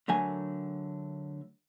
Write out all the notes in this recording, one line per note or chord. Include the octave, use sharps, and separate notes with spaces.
D3 F#3 A3 A#4 G#5